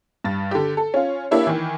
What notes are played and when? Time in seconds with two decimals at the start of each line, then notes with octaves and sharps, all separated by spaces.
0.24 G2 A6
0.51 D3 G4
0.77 A4
0.94 C#4 F4
1.31 A#3 D4 E4 G4 C#5
1.47 D#3 E3